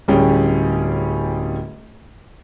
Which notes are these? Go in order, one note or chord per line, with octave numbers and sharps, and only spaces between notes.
D1 G3 C#4 G#4 G5